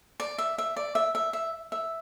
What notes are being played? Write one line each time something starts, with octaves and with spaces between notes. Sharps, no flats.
D5
E5
E5
D5
E5
E5
E5
E5